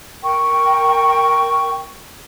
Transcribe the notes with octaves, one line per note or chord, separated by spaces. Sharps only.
A#4 G5 C#6